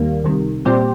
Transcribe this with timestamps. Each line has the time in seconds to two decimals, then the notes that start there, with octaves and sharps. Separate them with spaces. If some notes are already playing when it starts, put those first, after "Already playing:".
Already playing: D#2 D#3 G3 A#3
0.24 C2 C3 D#3
0.65 A#2 G3 C4 G4 C5